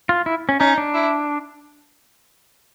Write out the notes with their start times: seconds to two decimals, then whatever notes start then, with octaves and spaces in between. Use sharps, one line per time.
0.09 F4
0.26 E4
0.49 C#4
0.60 C#4 D#4
0.78 D4
0.94 E4